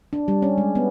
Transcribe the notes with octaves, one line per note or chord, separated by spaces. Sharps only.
D4
G3
C#4
G#3
B3